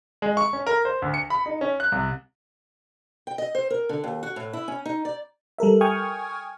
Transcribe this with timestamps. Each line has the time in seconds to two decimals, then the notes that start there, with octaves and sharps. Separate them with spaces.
0.22 G#3
0.37 C#6
0.53 C#4
0.66 A#4
0.85 C5
1.02 D2
1.14 C#7
1.30 B5
1.46 D#4
1.61 C#4
1.80 F#6
1.92 C2
3.27 G5
3.38 D#5
3.55 C5
3.70 A#4
3.89 D3
4.04 D#2
4.23 F#4
4.36 A2
4.53 E4
4.68 C#4
4.86 D#4
5.05 D5
5.58 G3 A4 A#4 E5
5.81 G5 G#5 C#6 D#6 F6 G#6